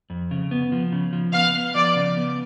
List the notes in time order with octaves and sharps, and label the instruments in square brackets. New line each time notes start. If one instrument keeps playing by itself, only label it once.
[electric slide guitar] F2
C#3
B3
F3
C#3
F3
[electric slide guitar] B3 [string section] F5
[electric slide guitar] B3
[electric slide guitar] F3 [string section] D5
[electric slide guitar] C#3
B3